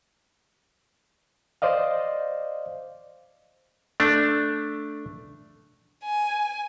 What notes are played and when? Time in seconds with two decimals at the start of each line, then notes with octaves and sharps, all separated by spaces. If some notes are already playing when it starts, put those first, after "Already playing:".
1.62 C5 D5 D#5 F5
4.00 A3 D4
6.04 G#5